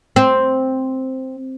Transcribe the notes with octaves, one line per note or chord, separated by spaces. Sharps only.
C4